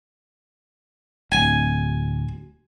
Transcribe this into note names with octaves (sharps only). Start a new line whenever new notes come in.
D1 G#5